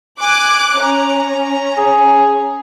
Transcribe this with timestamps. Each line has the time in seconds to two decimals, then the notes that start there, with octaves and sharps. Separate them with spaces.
0.21 G#5 D6 F#6
0.81 C#4 A#5
1.78 G#4